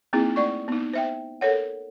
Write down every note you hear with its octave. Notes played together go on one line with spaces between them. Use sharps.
A#3 C4 D#4 E4 G#4
A3 D5 C#6
B3 D#4
C5 E5 G5
A4 A#4 C#5 F#5